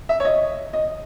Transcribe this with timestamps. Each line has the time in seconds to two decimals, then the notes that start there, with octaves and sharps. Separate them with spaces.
0.09 E5
0.20 C#5
0.25 D#5
0.73 D#5